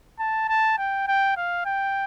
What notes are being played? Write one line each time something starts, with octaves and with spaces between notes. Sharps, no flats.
A5
A5
G5
G5
F5
G5